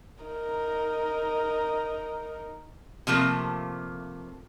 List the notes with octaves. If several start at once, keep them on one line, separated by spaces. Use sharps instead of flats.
D#4 A#4
C3 F3 A3 A#3